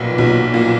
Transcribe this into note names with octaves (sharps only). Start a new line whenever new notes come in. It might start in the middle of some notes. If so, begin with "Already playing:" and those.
Already playing: B1 A#2 B4
B1
A#2